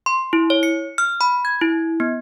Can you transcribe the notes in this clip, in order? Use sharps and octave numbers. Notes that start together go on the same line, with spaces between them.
C6
E4
C#5
C#7
F6
B5
G#6
E4
B3